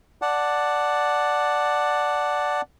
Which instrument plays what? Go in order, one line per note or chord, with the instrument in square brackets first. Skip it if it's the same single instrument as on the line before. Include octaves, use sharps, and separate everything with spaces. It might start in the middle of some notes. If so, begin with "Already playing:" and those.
[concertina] D5 F#5 A5